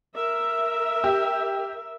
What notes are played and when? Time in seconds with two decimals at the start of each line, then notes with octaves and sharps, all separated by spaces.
0.15 A#4 E5
1.04 G4